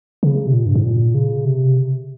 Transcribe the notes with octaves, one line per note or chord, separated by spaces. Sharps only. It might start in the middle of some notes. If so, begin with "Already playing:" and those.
C#3
C3
A#2
G2
G#2
A#2
C#3
C3